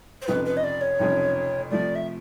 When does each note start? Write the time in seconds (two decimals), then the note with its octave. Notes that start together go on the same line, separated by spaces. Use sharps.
0.22 C5
0.27 F1 F2 C#3 F3 B4
0.45 B4
0.57 D#5
0.64 D5
0.81 C#5
0.99 F1 F2 C#3 F3
1.70 C3 F3 A3 D5
1.95 E5